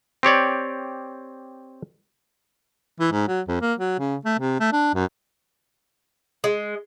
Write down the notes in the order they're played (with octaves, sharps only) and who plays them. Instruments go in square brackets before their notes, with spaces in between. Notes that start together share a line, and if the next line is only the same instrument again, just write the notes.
[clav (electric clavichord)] C4 G4 C#5 D5
[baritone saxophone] E3
G#2
F#3
F2
A#3
F#3
C#3
A3
C3
A3
D4
F#2
[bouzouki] G#3